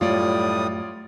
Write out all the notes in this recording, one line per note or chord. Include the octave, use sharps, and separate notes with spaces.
F#2 A2 G3 A3 F4 C#5 D5 D#6